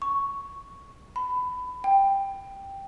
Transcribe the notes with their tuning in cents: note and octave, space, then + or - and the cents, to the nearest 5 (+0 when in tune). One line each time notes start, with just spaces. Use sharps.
C#6 +0
B5 +20
G5 +5